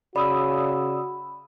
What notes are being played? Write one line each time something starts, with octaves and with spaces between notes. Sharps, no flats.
C#3 F#4 D5 B5 D#6 E6